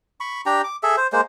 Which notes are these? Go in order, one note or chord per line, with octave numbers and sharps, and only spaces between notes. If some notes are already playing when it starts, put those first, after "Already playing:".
B5 C#6
D4 G4 G5 A#5
D6
G#4 A4 E5
C5
G#3 A#3 C5